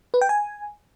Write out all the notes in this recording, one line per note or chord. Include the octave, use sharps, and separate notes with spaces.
B4
G5
G#5